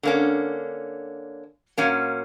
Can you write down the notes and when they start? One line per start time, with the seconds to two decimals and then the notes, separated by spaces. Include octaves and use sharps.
0.03 D3 A#3 C#4
1.78 A#2 F#3 A#3 C#4